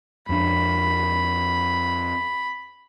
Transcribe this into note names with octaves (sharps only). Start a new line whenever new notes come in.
F2 D4 B5